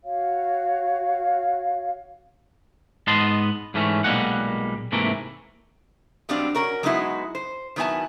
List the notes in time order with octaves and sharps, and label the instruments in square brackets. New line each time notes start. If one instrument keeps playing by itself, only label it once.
[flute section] F#4 C#5 F5
[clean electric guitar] G#2 B3 D#5 A5 C6
G#2 E3 A3 C#4
B1 A#2 G3 G#3 A#3 F#5
G#2 C3 E3 A3 A#3
[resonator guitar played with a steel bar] B2 F#3 G3 C4 D4 F5
C#4 F#4 A#4 C#5
F#3 G#3 B3 D#4 E4 F#4
C5
D#3 F#3 B3 E4 G#5 A5